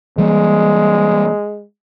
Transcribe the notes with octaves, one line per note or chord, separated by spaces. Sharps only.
E3 G3 G#3 A#3